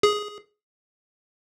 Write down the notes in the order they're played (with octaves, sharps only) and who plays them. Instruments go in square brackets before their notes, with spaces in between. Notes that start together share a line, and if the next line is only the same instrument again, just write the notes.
[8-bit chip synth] G#4